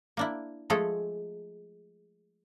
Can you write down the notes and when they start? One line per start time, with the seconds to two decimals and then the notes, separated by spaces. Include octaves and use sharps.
0.17 A#3 D4 E4
0.70 F3 G#3 A3 G#4 A4